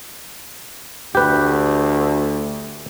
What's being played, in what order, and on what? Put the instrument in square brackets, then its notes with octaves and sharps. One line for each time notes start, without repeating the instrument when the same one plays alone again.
[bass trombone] D2 [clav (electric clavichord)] G4 B4